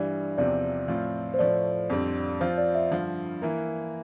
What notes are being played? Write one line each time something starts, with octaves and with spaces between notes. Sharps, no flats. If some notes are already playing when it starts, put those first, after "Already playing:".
Already playing: G2 E3 G3 D5
E2 C3 F3 C4 G4 D5
A2 F3 C4 F4
C5
A2 F3 A3 D5
F2 D3 G3 C4
F3 C4 F4 C5
D5
E5
G2 D3 F3 F5
E3 A#3 E4 A#4